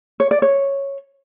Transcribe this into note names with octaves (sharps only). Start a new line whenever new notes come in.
C#5
D5
C#5